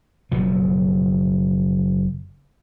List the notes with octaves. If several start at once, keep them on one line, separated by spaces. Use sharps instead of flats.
F#1 B2 F3